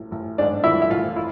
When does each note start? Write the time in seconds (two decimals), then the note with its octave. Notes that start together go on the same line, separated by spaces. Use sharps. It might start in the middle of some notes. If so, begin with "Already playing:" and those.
Already playing: A1
0.11 A1
0.38 G#2 D4 D5
0.64 E3 E4 E5
0.82 E5
0.90 A1 F4 F5
1.16 E4